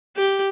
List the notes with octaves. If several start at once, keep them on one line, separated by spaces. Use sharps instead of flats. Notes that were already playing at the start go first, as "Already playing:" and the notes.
G4